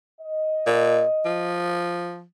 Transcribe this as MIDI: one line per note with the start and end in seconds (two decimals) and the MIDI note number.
0.21 1.56 75
0.67 1.04 46
1.26 2.24 53